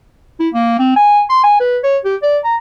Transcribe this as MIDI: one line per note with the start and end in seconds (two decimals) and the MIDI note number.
0.40 0.49 64
0.54 0.76 58
0.79 0.94 60
0.96 1.22 80
1.29 1.42 84
1.44 1.59 80
1.60 1.78 71
1.83 1.98 73
2.05 2.16 67
2.22 2.38 74
2.44 2.56 82